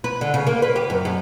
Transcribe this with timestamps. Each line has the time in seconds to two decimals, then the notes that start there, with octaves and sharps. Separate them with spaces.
0.04 B4
0.21 D3
0.34 C#3
0.47 A#3
0.62 B4
0.76 G4
0.90 F#2
1.05 F#2